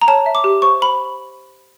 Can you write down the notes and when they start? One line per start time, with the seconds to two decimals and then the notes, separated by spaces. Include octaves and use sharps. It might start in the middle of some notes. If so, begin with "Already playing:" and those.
0.01 A#5
0.08 C#5 A5
0.26 E5
0.35 D6
0.44 G4
0.62 C5 C#6
0.81 C5 B5